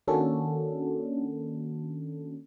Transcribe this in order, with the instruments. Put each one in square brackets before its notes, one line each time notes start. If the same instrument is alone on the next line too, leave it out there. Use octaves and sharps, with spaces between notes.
[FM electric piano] D#3 A#3 C#4 D4 F#4 A4